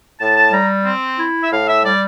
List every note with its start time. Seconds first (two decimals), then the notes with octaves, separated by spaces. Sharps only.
0.20 A2 A5
0.37 A5
0.53 G3 A#5
0.85 C4
1.19 E4
1.42 E5
1.51 A2 F5
1.68 E5
1.84 G3 D5